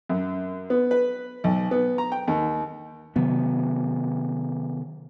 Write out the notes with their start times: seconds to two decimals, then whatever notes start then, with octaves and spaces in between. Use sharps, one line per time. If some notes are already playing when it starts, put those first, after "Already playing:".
0.09 F#2
0.70 B3
0.91 B4
1.44 B1
1.71 B3
1.98 A#5
2.12 G5
2.28 D#2
3.16 C3 D#3 F#3 B3